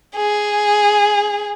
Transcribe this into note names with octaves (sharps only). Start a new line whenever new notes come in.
G#4